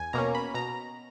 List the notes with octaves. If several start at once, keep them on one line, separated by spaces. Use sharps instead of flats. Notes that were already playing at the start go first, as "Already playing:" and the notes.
Already playing: E2 G#5
B2 A#3 C#4 A#5
B5
B2 A#5